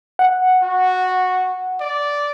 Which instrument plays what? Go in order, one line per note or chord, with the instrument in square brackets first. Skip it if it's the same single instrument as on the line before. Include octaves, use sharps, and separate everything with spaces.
[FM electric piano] F#5
[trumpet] F#4
D5